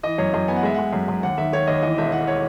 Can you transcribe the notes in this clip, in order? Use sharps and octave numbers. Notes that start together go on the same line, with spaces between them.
E3 D#5
F#2 C#5
F#2 D#5
B3 G#5
F#5
G#3 E5
G#3 F#5
F#2
F#2
D#2 F#5
D#3 E5
D#3 C#5
D#2 D#5
E3 D#5
E1 E5
E1 F#5
C#5